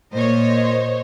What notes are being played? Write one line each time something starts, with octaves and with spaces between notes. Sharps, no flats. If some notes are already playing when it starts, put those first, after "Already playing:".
A#2 C5 C#5 D#5